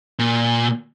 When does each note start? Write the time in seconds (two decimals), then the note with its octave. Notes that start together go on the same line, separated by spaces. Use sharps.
0.19 A#2